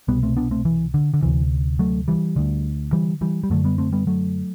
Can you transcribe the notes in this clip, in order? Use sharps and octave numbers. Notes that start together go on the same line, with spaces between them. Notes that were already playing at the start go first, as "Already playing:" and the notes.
C2 B2 G3 B3
A3 C4
B3 D4
A3 C4
E3
D3
D3
D2 C3 E3
F#3 A3
E3 G3
D2 D3
E3 G3
E3 G3
G3
F#2 D3 F#3 A3
G3 B3
A3 C4
G3 B3
F#3 A3